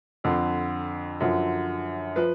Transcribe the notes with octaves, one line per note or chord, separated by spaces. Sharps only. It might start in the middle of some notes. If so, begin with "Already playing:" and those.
F2 D3 F3
F#2 D3 F3
F3 B4